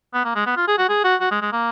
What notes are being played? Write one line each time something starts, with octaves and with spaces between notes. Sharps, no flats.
B3
A#3
G#3
B3
F4
G#4
F#4
G#4
F#4
F#4
G#3
G#3
A#3